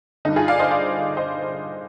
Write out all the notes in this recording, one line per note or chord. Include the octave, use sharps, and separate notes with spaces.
G2 D3 D#4
F4 G#4
D5 F5
C5 D#5
D5 F5
C5 D#5